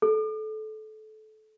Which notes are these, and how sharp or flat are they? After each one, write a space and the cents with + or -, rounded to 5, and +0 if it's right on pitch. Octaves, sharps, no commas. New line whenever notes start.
A4 -25